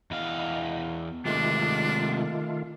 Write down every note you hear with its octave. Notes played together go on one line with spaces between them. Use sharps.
E2 D#5 F5 B5
C3 D#3 G#3 A3 D4 F4